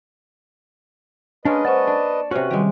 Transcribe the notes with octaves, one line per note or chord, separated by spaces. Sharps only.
G#3 A#3 C#4 D4 B4 D#5
C5 D5 F#5 A5 C#6
D4
C3 C#4 F#4 B4
D#3 G3 G#3 G4